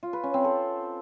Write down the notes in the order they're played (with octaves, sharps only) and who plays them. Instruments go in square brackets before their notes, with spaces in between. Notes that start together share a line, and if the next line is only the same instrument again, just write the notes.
[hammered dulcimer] F4
B4
C#4
C4
A4